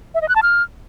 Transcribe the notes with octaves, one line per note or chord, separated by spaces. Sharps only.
E5
D#5
F#6
A5
F6